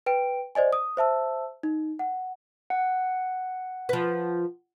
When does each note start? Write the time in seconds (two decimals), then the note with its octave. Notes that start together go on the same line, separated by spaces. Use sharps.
0.06 B4 G5 D7
0.55 C5 D5 D#5 G#5
0.73 D#6
0.97 C5 E5 A5 E6
1.63 D#4
1.99 F#5
2.70 F#5
3.89 F3 B4